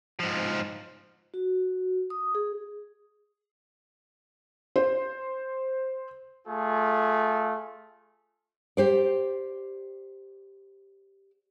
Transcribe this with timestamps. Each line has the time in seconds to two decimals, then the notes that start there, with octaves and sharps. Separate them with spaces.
0.20 G#2 F3
1.34 F#4
2.10 D#6
2.35 G#4
4.76 C5
6.47 A3 F4 G#4
8.77 G4 C5 D5